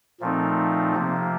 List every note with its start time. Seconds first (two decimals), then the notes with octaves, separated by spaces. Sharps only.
0.20 A#2 F3 A3 C4 D#4
0.94 C3 F3 A#3